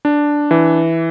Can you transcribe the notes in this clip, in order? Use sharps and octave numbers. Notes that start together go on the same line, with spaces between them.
D4
E3